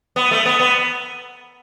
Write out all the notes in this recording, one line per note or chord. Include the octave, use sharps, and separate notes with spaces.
B3
A3
B3
B3